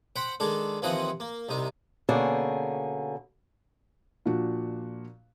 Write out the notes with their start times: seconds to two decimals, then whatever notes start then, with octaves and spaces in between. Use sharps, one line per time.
0.16 C5 F#5 G5 B5
0.40 D#3 G#3 D4 A4
0.82 D#2 E3 F3 C4 D#5 F#5
1.20 A#3
1.49 C2 C3 D#4
2.09 B2 D3 A#3 C#4 G#4
4.26 A#2 F3 D4 F#4